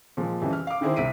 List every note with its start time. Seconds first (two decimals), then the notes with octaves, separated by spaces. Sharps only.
0.17 A#2 F3 G#3
0.42 F2 C#3 E3 G3
0.53 F6
0.67 F5 D6
0.81 D3 D#3 E4 G#4 C5
0.96 C2 E5 B6 D7 D#7